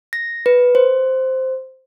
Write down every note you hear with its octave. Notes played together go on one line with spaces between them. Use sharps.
A#6
B4
C5